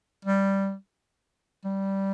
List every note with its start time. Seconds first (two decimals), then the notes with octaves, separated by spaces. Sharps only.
0.25 G3
1.65 G3